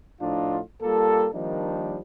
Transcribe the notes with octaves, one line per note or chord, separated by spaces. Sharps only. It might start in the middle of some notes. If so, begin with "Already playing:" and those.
A2 F3 D4 D#4 F4
G3 A#3 F4 A4
D#3 F3 G3 A#3 D4 D#4